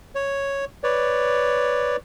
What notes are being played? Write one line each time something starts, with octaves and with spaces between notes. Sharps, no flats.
C#5
B4 C#5 D5